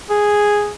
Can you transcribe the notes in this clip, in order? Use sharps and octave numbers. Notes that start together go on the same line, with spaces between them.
G#4